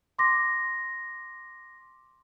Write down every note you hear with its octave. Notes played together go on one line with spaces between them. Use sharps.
C6 D6 A#6